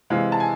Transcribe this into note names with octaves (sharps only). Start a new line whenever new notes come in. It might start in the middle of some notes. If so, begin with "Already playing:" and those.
C3 E3 G#3 F5
A5
G#5